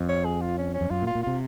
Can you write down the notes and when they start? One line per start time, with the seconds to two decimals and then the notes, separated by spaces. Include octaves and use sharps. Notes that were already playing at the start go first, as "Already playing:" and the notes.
Already playing: F2
0.09 C#5
0.25 G#4
0.41 F4
0.58 C#4
0.74 C#4
0.81 F2
0.90 F#2 F4
1.02 A#2
1.07 F4
1.15 A#2
1.23 C3 F4